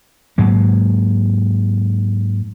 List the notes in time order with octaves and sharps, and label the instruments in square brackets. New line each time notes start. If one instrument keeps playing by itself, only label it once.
[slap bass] G#2 F#3 A#3